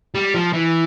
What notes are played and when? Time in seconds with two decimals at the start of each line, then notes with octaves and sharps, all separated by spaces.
0.15 G3
0.34 F3
0.54 E3